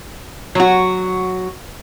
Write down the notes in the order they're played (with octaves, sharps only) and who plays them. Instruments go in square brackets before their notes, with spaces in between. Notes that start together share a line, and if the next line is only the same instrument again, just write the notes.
[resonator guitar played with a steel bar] F#3 F#4